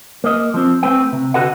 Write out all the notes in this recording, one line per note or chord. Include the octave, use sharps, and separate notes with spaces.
A#3 D#5
F3 C4
A3 C4 B4 G5
C3
D3 F#4 A4 B4 D#5 F#5